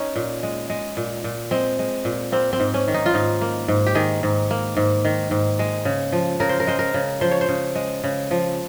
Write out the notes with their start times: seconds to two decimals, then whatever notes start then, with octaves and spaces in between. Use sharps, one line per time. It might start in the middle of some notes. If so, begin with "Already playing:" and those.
Already playing: C#4 D#4
0.16 A#2
0.43 G#3
0.70 G#3
0.97 A#2
1.24 A#2
1.51 G#3 C4
1.79 G#3
2.05 A#2
2.32 A#3 C4
2.53 C4
2.60 G#2
2.74 C#4
2.88 D#3
2.94 D#4
3.06 F4
3.14 G#2 D#4
3.41 A#3
3.68 G#2
3.86 G4
3.95 D#3 G#4
4.23 G#2
4.51 A#3
4.77 G#2
5.05 D#3
5.31 G#2
5.59 G#3
5.85 C#3
6.12 F3
6.40 C#3 A#4
6.49 C5
6.60 A#4
6.67 G#3 C5
6.79 A#4
6.94 C#3
7.21 F3 C5
7.31 C#5
7.41 C5
7.49 C#3
7.75 G#3
8.04 C#3
8.31 F3